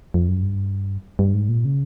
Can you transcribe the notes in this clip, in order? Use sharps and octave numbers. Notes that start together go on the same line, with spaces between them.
F2
F#2
G2
G2
G#2
A#2
C#3